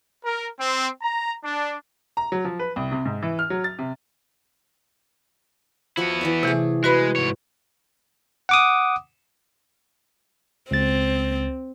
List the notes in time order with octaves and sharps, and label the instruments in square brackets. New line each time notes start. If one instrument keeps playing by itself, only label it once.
[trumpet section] A#4
C4
A#5
D4
[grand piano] A#5
F#3
F3
B4
C2
C3
G#2
E3
F6
F#3
A6
C3
[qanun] F3 F#4 F#5 [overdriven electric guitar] B3 E4
[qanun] E3 D5 E5
[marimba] C3 E3 [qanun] A3 G#4
[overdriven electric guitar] G#3 [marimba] F#4 B4 B5
[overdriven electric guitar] G#2 C#5
[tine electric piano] F#5 D6 D#6
[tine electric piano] C#2 A6 [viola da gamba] C4